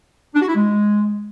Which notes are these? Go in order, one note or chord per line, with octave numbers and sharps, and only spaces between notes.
D4
F#4
E4
G#3